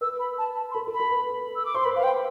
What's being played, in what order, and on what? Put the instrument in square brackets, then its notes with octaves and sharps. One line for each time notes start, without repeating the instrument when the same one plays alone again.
[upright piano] B4 [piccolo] E6
[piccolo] B5
A5
A5
C6
[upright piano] A4 [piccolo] B5
[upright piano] A4
[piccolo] B5
[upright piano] A4
B4
[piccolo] E6
D6
[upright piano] C5 [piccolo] C6
[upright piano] B4 [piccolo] B5
[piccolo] F5
G5